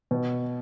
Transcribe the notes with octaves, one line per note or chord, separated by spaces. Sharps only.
B2